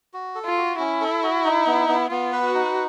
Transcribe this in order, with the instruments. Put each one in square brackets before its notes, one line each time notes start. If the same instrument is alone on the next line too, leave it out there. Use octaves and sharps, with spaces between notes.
[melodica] F#4
A4
[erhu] F4
[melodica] F#4
[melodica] C#4 [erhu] E4
[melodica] A4
F#4
D#4
B3
B3
[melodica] B3 [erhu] F4
[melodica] B4
[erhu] F#4
[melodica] D#4